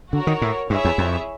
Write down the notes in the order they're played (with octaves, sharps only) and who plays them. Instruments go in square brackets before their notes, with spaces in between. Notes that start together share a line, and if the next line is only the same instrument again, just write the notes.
[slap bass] D3 [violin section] F#4 A#4 C#5
[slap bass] D#3
A2
[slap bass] G2 [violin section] E4 G#4 C#5 E5
[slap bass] E2
F2